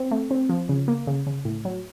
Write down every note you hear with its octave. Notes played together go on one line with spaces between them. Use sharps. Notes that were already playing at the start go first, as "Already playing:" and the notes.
Already playing: C4
A3
C4
F3
C#3
A#3
C#3
C#3
A2
F#3